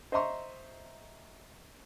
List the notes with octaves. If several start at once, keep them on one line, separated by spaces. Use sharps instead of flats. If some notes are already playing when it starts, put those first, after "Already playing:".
C5 D#5 E5 A#5 C6 C#6